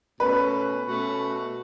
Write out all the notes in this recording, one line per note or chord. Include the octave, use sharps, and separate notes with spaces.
B2 A3 C#4 F#4 B4
B2 A3 C#4 F#4